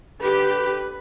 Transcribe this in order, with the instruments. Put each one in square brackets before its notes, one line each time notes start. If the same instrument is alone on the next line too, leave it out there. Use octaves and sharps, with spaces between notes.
[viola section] D3 G4 [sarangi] B4